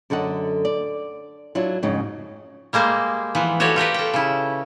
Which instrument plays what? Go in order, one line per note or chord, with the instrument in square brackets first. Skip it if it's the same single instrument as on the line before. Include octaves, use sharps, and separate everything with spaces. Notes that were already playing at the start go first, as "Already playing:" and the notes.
[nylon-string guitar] F#2 D3 A4 D#5 F#5
D5
F#3 D4 E4 F4
F2 G#2 C#3 C#4 D#4
[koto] G3 G#3 A#3 C5
E3 F3 B3
F#4 G4 A4 C#5 D5
F4 G4 A#4 B4
A4 G5
C#3 E4